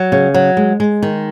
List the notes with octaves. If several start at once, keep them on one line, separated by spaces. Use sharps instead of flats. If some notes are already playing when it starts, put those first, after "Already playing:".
Already playing: F#3
C#3
F#3
G#3
G#3
D#3